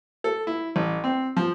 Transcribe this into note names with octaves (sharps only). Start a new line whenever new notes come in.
A4
E4
A1
C4
F3